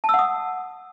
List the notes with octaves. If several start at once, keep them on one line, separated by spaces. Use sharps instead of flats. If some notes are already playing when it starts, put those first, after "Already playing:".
F#5 A5 D#6 E6